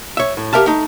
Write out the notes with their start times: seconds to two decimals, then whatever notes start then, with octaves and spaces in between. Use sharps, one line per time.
0.17 C#5 E5
0.37 A2
0.53 G4 A#4 E5 F5 A5
0.66 A3 D#4